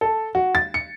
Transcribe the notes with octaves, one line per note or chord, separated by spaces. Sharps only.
A4
F#4
A6
C#7